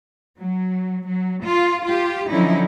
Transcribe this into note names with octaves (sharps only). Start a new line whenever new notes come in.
F#3
F#3
F4
F4 G4
D3 F3 F#3 C#4 D#4 E4